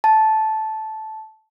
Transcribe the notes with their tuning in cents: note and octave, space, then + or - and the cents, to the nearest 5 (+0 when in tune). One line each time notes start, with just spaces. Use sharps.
A5 -10